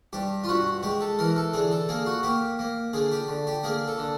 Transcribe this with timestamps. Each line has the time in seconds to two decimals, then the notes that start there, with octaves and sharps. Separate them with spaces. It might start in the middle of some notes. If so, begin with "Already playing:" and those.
0.13 G2 G4
0.44 F4
0.48 G2 F#4
0.83 G#3 G4
1.01 A4
1.19 E3 A#4
1.36 A4
1.54 D3 G#4
1.71 A4
1.89 A#3 G#4
2.06 F#4
2.23 A#3 G4
2.59 A#3
2.93 D3 G#4
3.12 G4
3.28 D3
3.47 G4
3.63 A#3 G#4
3.88 A4
3.98 D3